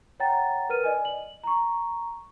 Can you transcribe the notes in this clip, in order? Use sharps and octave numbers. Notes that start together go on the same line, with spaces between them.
C#5 F#5 G5 A#5 A6
A#4 B4 F6 D#7
D5 D#5 G#5
F#7
A#5 C#6